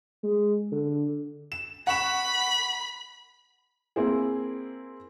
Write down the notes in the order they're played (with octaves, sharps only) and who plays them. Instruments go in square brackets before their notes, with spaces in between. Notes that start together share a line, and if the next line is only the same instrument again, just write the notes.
[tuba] G#3
D3
[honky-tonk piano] E7
[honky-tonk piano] F#5 C#6 E7 [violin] B5
[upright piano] A#3 C4 E4 G#4